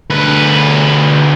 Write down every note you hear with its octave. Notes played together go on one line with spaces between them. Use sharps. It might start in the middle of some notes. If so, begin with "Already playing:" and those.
D2 B4